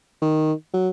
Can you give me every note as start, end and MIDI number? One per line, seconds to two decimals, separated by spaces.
0.22 0.53 51
0.74 0.89 54